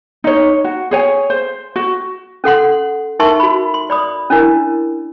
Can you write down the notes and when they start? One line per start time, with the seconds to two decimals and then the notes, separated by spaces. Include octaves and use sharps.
0.24 D#4 C#5
0.64 F#4
0.91 G#4 C#5 G#5
1.30 C5
1.76 F#4
2.44 C#4 A4 F#5 C6
3.19 D#4 A#4 E5 A5 C6 C#6
3.40 F#4 B5
3.74 C6
3.90 D5 B5 D#6
4.30 C#4 D4 E4 A#4